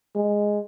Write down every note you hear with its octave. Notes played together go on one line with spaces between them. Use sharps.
G#3